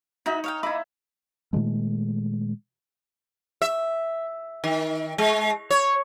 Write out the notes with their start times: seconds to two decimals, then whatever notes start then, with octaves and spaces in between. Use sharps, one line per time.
0.26 D#4 E4 F#4 E5
0.44 C#5 F5 G5
0.63 E4 D#5 E5 B5 D6
1.53 A#2 D#3 G#3 A3
3.62 E5
4.64 D#3
5.18 G#3
5.70 C#5